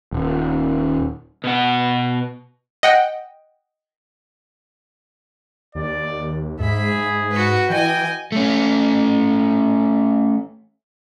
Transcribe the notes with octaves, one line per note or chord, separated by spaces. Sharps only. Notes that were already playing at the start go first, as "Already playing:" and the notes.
D#1
B2 F#5
D#5 F#5 G5
D#2 D5
G#2 G#4 E5 B5
G#2
F#4 B4
E3 D#5 G5 G#5
A3 C#4